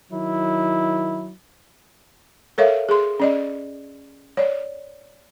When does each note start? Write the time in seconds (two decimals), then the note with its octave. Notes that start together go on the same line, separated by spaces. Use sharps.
0.11 D#3 F#3 E4
2.58 A4 A#4 C#5 E5 F5
2.89 G#4 C6
3.20 C#4 D5 D#5
4.37 C#5 D5